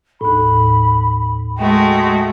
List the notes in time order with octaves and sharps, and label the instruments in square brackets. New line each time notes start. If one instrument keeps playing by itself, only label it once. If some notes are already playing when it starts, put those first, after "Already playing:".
[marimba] D#2 A2 [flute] B5
[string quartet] G#3 A3 F#4 [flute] G5